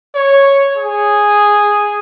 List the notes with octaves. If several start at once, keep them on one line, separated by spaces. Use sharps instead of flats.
C#5
G#4